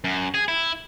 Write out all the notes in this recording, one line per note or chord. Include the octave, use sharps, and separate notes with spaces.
F#2
G#4
E4